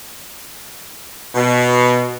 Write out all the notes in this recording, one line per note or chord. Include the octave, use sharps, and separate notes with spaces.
B2